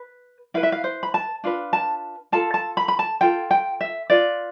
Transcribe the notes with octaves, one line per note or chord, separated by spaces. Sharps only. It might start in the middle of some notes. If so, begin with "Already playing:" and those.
Already playing: B4
E4 B4 F5
E5
F5
C5
B5
A5
D4 F4 B4
A5
F4 A4 A5
A5
B5
B5
A5
F4 A4 G5
G5
E5
F4 B4 D5